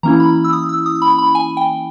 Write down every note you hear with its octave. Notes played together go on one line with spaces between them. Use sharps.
E3 A#3 C#4 E4 A#5
B5
E6
D#6
E6
D#6
B5
B5
G#5
G5